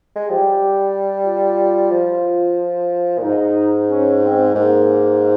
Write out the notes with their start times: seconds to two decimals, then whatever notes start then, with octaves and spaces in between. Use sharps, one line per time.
0.15 G#3
0.26 F3 G4
0.38 G3
1.25 F4
1.91 F3
3.18 A#2
3.23 G#2 D#4
3.89 C#4
4.22 C4
4.54 G#2 A#3